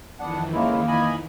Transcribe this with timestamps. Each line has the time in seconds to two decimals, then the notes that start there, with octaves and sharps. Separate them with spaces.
0.20 F2 D#3 E3 B3 D4 F#5
0.53 C#3 G#3 A#3 E4
0.88 D#5 G#5 B5